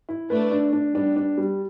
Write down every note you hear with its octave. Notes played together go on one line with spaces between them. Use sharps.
E4
A3 D4 B4
D4
D4
G3 B3 D4
D4
G3